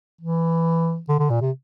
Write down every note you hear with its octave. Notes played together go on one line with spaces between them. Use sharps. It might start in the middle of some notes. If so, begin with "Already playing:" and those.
E3
D3
D3
A#2
C3